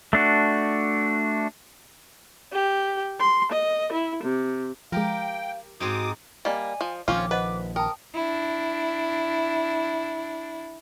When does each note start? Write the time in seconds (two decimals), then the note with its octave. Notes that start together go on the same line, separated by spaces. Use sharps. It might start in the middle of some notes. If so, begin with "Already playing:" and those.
0.13 A3 D4 F#4
2.52 G4
3.20 C6
3.51 D#5
3.92 E4
4.23 C3
4.92 F3 G#3 G4 A#4 F5 G5
5.80 G#2 C4 D#4 F#4 D6 D#6
6.45 G3 A#3 D5 D#5 G#5
6.81 F3
7.08 A#1 D#3 F3 C4 C#4 F4 D6
7.31 B4 C5 D#5 F#5
7.76 A#4 G5 A5 D#6
8.14 D4 E4